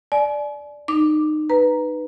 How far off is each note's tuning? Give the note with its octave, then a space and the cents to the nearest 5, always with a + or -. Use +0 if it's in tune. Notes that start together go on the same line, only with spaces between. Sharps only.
D5 +0 G#5 +45
D#4 -25 D6 +0
B4 +0 A#5 +5